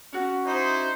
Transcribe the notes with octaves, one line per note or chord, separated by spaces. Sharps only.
C#4 F#4
D#4 E4 C5